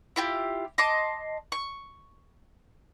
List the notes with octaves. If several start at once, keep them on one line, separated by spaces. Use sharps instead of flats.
E4 F4 G4
D#5 A5 C6 D6
C#6